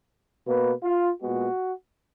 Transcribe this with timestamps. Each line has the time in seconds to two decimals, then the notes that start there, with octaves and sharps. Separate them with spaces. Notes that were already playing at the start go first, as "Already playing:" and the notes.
0.46 B2 A#3 B4
0.83 F4
1.21 A#2 G#3 B3 F#4